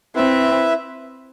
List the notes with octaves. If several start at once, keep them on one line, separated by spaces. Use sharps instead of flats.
C4 E4 B4 E5